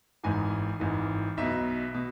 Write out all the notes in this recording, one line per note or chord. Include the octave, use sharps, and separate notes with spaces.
G#1 G#2 E3 G#5
G#1 G#2 E3
B1 B2 E5
B2